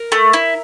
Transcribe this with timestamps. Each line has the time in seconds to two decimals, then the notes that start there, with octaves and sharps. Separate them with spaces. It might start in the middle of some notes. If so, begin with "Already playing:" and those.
Already playing: A#4
0.12 A3
0.33 E4